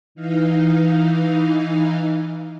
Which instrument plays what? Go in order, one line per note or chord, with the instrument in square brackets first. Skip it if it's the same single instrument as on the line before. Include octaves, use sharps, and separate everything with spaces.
[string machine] E3 D#4 F5